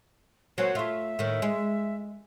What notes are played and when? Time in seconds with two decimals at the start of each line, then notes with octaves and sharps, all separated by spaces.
0.58 F#3 A#3 C#4 C5
0.75 A3 F4 E5
1.19 A2 D#3
1.42 G#3